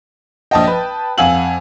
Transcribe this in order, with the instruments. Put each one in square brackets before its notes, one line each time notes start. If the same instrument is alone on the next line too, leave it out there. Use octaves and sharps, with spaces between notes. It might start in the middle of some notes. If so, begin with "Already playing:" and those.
[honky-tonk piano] A#1 D#5 [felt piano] G5 A5 D#6
[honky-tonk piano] B4
[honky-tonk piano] F2 G#5 F#7 [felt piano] F5 F#5 E6